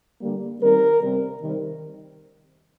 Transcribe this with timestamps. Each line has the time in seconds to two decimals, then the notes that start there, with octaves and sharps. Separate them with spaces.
0.21 D3 G3 A#3
0.60 D#3 G3 C4 A#4
1.01 C3 G3 C4
1.41 C3 D#3 G3 C4